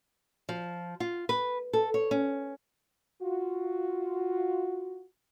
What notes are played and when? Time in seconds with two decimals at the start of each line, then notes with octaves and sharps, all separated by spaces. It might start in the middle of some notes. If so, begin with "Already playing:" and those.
0.49 F3
1.00 F4
1.29 B4
1.73 A4
1.94 C#5
2.11 C#4
3.21 F4 F#4